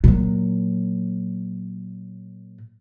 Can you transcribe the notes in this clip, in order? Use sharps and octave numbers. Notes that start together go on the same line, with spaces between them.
A#2 F#3